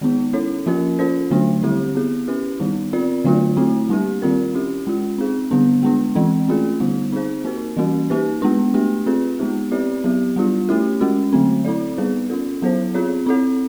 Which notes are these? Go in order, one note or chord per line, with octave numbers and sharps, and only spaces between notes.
D#3 G#3 B3 D#4
C#4 E4 A4 C#5
F3 A#3 C#4 F4 A#4
C#4 F4 A4 C5
D3 F#3 A3 D4
D3 G3 C4 E4 G4
B3 E4 G#4
C#4 E4 G4 B4
D#3 G3 B3 D#4
C4 F4 A#4 D5
D3 F#3 A3 D4 F4
A3 C4 E4
G3 A#3 D4 G4
D#3 G3 C4 F4 A#4
C#4 E4 G4
G#3 C#4 F4
C4 D#4 G#4
D3 G3 B3 D4
G#3 B3 D4
E3 G#3 C4
A3 C#4 F4 G#4
D3 G3 B3 D#4
C4 D#4 G#4 C5
A#3 D#4 F#4 A#4
E3 G3 A#3 C#4 F#4
A#3 D#4 G4 B4
G#3 B3 D4
A3 D4 G4
C4 F4 G#4 B4
G#3 B3 D#4 G4
C4 E4 G4 B4 D5
F#3 B3 E4 G4
G3 B3 D4 F4
A3 C#4 E4 G4
G#3 C#4 F#4
D3 F#3 A3 C4
C4 E4 A4 D5
G3 B3 D#4 G#4 B4
C#4 F4 A4
F#3 B3 E4 A4 C5
C4 F4 G#4 C#5
C4 E4 A4 C#5